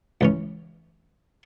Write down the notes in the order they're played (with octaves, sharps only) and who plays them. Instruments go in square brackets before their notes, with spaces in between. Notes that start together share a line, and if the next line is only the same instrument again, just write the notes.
[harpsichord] C#2 E3 C#4